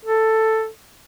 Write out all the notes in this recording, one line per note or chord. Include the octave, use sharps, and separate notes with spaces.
A4